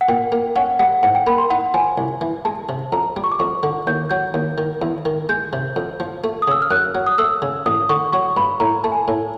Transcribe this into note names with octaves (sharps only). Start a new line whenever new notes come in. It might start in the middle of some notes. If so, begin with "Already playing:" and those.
F#5
A#2 G5
A#3
C#4 F#5
G3 F#5
G#2 F#5
G5
A#3 B5
C6
D#4 F#5
F3 G#5
C2
E3
G#3 A5
C3
F2 A#5
G3
C#6
D6
F2 C#6
D3
D#2 G6
F#3 G6
D#2
D#3
E2
D#3
G#3 G6
C3
F2
F3
A3
D#6
C#3 E6
F6
F#2 F#6
F#3
D#6
A3 E6
C#3
A1 D#6
D3 C#6
F#3 C#6
G2 B5
A2 A#5
A3 A5
G#5
A2